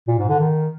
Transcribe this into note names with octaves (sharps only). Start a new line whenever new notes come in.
A#2
G#2
D3
D#3